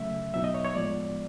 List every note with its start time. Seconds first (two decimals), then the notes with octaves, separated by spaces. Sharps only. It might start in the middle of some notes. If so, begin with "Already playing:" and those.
Already playing: C#3 F#3 A3 E5
0.33 B2 F#3 B3 D#4 E5
0.44 D#5
0.54 C#5
0.65 C#5
0.75 A2 F3 G#3 B3 D5